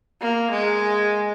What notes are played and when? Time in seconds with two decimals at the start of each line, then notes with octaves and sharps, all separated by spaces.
0.21 A#3
0.51 G#3